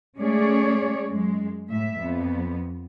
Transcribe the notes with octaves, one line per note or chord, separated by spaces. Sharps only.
G#3 A3 C#4 G#4 C#5 D5
F#2 G#3
A2 E5
F2 B3